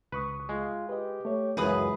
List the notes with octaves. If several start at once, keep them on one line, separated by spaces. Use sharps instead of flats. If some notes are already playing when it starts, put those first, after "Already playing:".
C#2 B4 C#6 D#6
G#3 F4
G4 B4 D#5
A3 C#5
C#2 F#2 E3 G#3 E4 G#4 B4 D#6